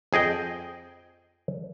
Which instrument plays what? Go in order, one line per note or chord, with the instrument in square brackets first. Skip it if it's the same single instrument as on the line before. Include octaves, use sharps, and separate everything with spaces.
[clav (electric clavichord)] F2 G#4 D#5 G5